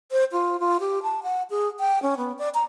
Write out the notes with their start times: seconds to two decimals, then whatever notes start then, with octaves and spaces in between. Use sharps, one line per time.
0.11 C5
0.32 F4
0.60 F4
0.80 G4
1.03 A5
1.23 F#5
1.50 G#4
1.80 G5
2.02 C#4
2.17 B3
2.39 D5
2.54 A#5